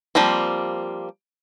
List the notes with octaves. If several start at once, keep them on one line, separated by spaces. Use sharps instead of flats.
F3 G3 A#3 C4